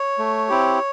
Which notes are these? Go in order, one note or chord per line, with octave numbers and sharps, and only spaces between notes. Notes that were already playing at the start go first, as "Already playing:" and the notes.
Already playing: C#5
A3
C4 E4 G4